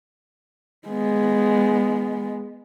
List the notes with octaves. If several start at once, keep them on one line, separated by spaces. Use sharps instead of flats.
G#3 B3